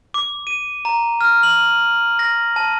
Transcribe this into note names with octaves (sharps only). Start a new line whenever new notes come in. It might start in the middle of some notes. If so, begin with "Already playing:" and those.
D6
D#7
A#5
F6
F#7
A#6
A5